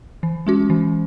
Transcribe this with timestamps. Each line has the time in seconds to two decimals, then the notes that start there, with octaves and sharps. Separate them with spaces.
0.23 E3
0.47 G#3 C#4 F#4
0.70 E3